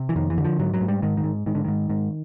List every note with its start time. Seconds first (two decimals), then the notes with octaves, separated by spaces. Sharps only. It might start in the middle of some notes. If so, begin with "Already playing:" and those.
Already playing: C3
0.09 E3
0.16 F2 D#3
0.30 E3
0.38 D3
0.44 F3
0.59 G#2 F#3
0.74 F#3
0.81 G#2
0.88 G3
1.02 G#2 D#3
1.17 D#3
1.24 G#2
1.46 G#2 D#3
1.55 D3
1.64 G#2 D#3
1.89 G#2